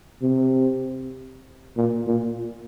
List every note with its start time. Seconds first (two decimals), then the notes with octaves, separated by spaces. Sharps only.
0.22 C3
1.77 A#2
2.07 A#2